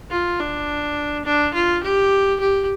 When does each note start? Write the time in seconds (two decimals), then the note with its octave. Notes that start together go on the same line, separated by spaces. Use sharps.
0.11 F4
0.40 D4
1.25 D4
1.54 F4
1.83 G4
2.40 G4